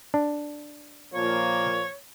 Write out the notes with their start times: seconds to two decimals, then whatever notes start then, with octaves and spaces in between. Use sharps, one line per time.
0.14 D4
1.14 A#2 F3 A#3 C#5